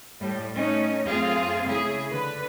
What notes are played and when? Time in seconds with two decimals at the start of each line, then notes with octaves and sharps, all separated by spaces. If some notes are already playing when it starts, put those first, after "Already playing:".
0.20 A2 G3
0.54 A3 C#4 D#4
1.07 F#2 A3 C4 F4 G#4 F5
1.67 C#3 A3 E4 G#4
2.10 D3 B4